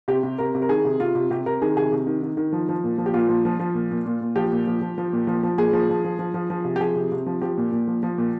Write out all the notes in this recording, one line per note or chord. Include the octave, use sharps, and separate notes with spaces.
C3 G4
C3
C3 A#4
C3
A#4
D#3 G#4
C3
C3 F4
C3
C3 G4
C3 A#4
D#3 G#4
C3 G#4
C3
D#3
D#3
D#3
F3
F3
A#2
F3
G4
A#2 F4
F3
F3
F3
A#2
A#2
A#2
A#2
F3 G4
A#2
F3
F3
F3
A#2
F3
F3
A#2 G#4
F3
F3
F3
F3
F3
F3
C3
G4
F3 G#4
C3
C3
F3
F3 G4
A#2
A#2
F3
F3
A#2